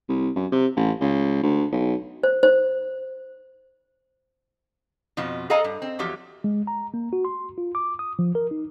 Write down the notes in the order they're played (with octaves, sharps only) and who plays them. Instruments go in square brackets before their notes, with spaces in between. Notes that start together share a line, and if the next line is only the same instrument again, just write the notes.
[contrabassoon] C2
F#2
C3
A1
C#2
D2
B1
[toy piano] C5
C5
[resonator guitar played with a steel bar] F2 B2 F3 F4
G#4 A4 D#5 F5 G#5 A#5
G2
C4
E2 F3 F#3 G4
[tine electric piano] G#3
A#5
A#3
F#4
C6
F4
D6
D#6
F3
A#4
D#4